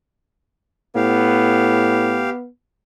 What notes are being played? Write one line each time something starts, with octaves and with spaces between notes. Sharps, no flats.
A2 B3 G4 F5